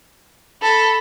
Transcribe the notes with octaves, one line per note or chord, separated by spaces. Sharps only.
A4 B5